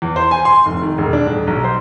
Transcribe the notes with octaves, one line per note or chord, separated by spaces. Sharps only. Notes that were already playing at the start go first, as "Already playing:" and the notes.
E2
C5
G#5
C6
F1
D#3
E1
D4
D#1
B1
C5